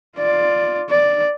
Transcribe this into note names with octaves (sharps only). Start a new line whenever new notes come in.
F4 D5
D5